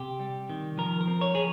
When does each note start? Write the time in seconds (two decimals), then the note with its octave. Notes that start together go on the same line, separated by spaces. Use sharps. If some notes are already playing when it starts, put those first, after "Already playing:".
Already playing: C3 G4
0.19 G3
0.50 D#3
0.78 F3 A#4
1.01 A#4
1.07 C4
1.21 C#5
1.35 F3 G#4